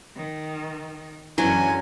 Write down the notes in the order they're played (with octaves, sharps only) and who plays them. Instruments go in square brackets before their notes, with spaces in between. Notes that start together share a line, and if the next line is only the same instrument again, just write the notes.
[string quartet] D#3
[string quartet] F#2 D3 C#4 [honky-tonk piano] E3 [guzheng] F#3 [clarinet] G#5